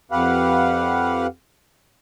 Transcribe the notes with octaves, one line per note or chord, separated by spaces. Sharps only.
F2 G4 B4 F5 F#5